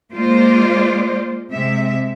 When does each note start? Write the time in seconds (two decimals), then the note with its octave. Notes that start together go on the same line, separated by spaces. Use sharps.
0.13 G#3 A#3 F4 C5 D5
1.51 C3 G#3 E5